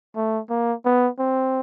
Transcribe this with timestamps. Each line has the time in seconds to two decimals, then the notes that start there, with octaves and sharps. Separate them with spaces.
0.16 A3
0.50 A#3
0.85 B3
1.19 C4